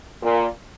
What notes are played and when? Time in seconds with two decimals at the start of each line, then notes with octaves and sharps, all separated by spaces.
0.22 A#2